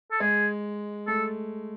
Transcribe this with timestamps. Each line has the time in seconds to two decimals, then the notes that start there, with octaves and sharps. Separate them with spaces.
0.11 A4
0.20 G#3 G#4
1.07 A3 A4